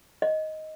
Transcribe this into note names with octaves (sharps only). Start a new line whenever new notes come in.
D#5